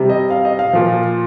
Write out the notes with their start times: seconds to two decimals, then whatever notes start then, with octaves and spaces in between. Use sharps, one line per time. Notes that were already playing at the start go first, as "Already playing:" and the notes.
Already playing: C3 G3
0.09 D#5
0.30 F5
0.45 D#5
0.59 F5
0.73 A#2 F3